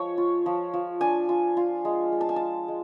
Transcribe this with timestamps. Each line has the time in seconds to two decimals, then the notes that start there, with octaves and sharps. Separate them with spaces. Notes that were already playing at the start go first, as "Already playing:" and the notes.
Already playing: F3 G#3 C#5
0.18 F4
0.46 F3
0.74 F3
1.01 D4 G#5
1.29 F4
1.57 F4
1.85 G#3
2.12 G#3
2.21 A5
2.29 G#5
2.36 F4 A5
2.68 G#3